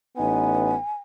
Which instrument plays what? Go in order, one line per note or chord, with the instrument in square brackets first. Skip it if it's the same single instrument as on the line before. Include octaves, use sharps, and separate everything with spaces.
[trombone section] A1 B3 D#4 [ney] G#5